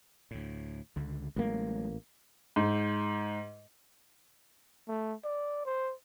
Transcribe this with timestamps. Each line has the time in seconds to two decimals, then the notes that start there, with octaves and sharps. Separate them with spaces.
0.31 D2 A2
0.96 C#2 D3
1.36 A1 A2 F#3 G#3 A#3
2.56 G#2
4.88 A3
5.24 D5
5.65 C5